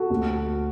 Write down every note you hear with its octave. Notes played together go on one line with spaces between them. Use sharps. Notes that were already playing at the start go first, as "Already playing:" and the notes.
Already playing: F#4 A4
D2